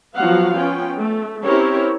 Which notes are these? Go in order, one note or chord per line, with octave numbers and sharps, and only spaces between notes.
F3 F#3 B3 F#4 F5 F#5
B3 C#4 F4 G5
A3
C4 C#4 E4 G4 A#4 C#5